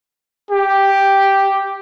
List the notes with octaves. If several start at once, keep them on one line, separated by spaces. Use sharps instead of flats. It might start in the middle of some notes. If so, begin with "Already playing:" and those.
G4